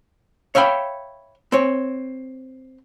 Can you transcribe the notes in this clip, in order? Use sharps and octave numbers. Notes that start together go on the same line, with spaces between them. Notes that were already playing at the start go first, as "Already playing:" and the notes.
C#5 E5 F5 G5 B5
C4 C#5